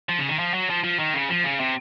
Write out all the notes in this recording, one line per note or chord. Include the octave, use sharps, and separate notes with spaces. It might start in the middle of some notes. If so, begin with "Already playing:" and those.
F3
C#3
D#3
F3
F#3
F3
F3
D#3
C#3
F3
C#3
C3